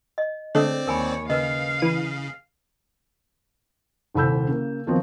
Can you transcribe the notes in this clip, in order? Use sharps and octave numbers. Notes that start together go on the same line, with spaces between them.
D#5
D3 G#3 A3 C4 C#5 D5
D#2 A#4 C#5 G#5 B5
C#3 A#4 B4 D#5 F5
E3 D#7
D#1 C2 A4 B5 E6 G6
C#3 A#3
D#2 D#3 F3 F#3 B3 C4